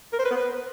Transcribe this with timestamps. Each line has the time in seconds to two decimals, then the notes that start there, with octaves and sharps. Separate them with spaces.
0.13 A#4
0.19 C5
0.25 B4
0.31 B3
0.37 B4